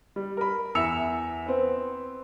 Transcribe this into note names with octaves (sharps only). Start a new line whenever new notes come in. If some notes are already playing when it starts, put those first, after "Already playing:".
G3
A#4 B5
E2 E5 E6 C#7 F7
B3 C4